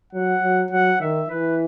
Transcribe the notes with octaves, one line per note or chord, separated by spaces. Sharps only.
F#3 F#5
F#3
F#3 F#5
D#3 E5
E3 B4